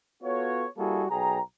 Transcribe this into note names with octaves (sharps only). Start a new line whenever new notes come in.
B3 F4 F#4 A4 C#5
G3 A#3 E4 F#4 G#4 A4
B1 G#4 G5 A#5